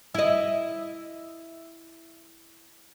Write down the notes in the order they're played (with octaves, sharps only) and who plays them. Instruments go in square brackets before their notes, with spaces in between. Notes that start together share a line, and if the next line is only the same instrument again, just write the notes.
[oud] E4 D#5